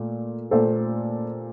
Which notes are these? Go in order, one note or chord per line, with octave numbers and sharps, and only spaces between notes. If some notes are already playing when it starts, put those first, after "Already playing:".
Already playing: A#2 A3
A#2 A3 A4 C5